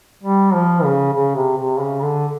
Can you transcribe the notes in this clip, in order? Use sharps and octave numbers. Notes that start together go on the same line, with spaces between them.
G3
F3
C#3
C#3
C3
C3
C#3
D3